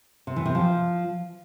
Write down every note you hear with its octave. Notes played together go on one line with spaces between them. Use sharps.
C3
E3
C3
F3